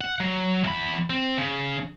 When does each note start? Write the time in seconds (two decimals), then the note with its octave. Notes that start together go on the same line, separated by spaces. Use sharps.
0.01 F#5
0.20 F#3
0.64 E2 B5
1.10 C4
1.38 C#3